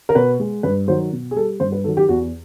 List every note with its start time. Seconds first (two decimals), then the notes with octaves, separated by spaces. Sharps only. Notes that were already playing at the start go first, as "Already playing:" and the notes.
0.09 A#4
0.15 B2 B4
0.40 G#3
0.63 G2 B4
0.88 D#3 F#3 C5
1.12 B2
1.31 G#4
1.36 G3 A4
1.60 G2 C5
1.72 B4
1.84 D#3 F#3 A4
1.97 G4
2.09 E2 F#4